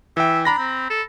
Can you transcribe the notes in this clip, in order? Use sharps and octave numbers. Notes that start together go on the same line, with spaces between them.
E3 E5 G5
D4 A#5 B5 A#6
C4
A4